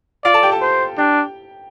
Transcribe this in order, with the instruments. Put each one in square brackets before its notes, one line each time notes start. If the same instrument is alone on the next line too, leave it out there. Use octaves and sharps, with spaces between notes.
[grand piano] F4 F5 [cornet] D5
[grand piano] A4 A5
G4 G5
A4 A5
[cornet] C5
[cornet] D4 [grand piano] G4 G5